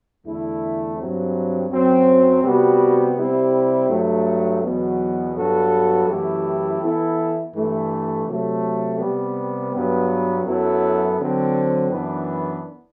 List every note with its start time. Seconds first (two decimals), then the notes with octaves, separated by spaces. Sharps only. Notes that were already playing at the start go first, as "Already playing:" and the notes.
0.24 E2 D3 A3 E4
0.97 G2 F#3 C4
1.70 F#2 F#3 C4
2.42 C3 G3 B3 F#4
3.16 C3 G3 C4 E4
3.88 G2 F#3 A3
4.61 E2 B2 F#3 B3
5.35 G2 F#3 B3 F#4 A4
6.07 F#2 E3 A3 E4 G4
6.81 E3 B3 E4 A4
7.53 G2 E3 A3
8.26 C3 F#3 A3
8.99 C3 G3 B3
9.72 G2 F#3 B3
10.44 F#2 F#3 B3 E4 A4
11.18 D3 F#3 C4
11.90 F#2 E3 B3 D4